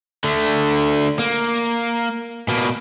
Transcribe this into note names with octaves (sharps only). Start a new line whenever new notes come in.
D3 A3
A#3
B2 A#3